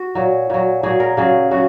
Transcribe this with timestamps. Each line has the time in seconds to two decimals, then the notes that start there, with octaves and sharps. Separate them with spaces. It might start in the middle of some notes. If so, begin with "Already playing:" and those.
Already playing: F#4
0.15 A#2 F#3
0.50 A#2 F#3
0.83 A#2 F#3 G#4
1.00 A#4
1.17 C#3 F#3 G#4
1.51 C#3 F#3 F#4